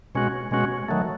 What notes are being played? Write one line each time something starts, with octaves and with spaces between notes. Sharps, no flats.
B2 G#3 C#4 F#4
B2 G#3 C#4 F#4
D#3 F#3 A3